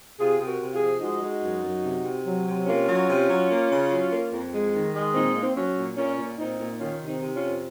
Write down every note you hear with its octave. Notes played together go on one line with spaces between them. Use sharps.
C3 F4 G#4
C3
F#4 A#4
C3
F4 G#4
F3
G#3 D#4 F#4
G#3
F#2
F#2
C3
C3
F#3
C3
A#3 C#4 F4
F#3
C3
F#3
A#3
C#3
F#3
A#3
F2
G#3
D#3
G#3
A#2 C4 D#4
A#3
C4
F#3 C#4
A#2
A#2 C#4
A#2
A#2 C4 D#4
A#2
D#3 C#4 F4
C3
C4 D#4
C3
C#4 F4
F2